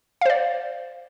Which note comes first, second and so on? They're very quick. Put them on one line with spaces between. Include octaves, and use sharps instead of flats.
F5 C5 D5